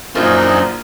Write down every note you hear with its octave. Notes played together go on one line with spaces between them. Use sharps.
A#1 F#2 F#3 A#3 D4 D#4 F4 C5